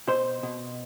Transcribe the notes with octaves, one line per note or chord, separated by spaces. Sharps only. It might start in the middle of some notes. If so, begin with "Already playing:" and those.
B2 C5
B2